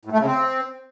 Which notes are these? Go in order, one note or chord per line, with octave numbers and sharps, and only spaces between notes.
A2
A3
C#3
C4